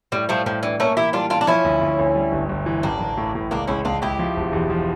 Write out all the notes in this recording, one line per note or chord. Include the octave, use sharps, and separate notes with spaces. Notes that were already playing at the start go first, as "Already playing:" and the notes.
A2 G3
F3 G3 A3
A2 F3
E3 D4
A3 A#3 C#4
E3 E4 G4
G3 D4 F4
E3 D4 F4
D4
F3 C#4 E4
D2
D2
D2
G3
G1
G1
E3
A1 A#3 D4
A1
A2
A2
C#2 A#3 D4
C#2 C#4 E4
C#2 D4 F4
C#2 E4 G4
F3
E1
E2
F3